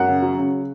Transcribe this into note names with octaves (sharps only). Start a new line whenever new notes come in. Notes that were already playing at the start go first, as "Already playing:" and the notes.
Already playing: F#2 F#5
C#3
F#3
C#3